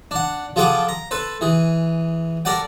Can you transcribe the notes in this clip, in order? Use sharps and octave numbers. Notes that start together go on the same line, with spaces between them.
D4 F#5
F3 F4 G#4 A4 F#5 D6
A#5
A4 B4 C5
E3 G#4
A4 A#4 D5 F#5 G5